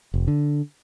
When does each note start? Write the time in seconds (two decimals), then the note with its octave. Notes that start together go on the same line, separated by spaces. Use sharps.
0.14 F1
0.28 D3